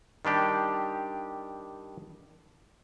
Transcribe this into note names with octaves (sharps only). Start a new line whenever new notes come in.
D#3 G3 D4 G4